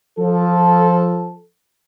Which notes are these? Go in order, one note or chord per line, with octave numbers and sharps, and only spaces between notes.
F3 A4